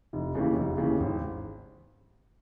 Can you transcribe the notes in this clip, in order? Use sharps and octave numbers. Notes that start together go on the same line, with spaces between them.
F1
D#2 C#3 E3
F1
D#2 C#3 E3
G#1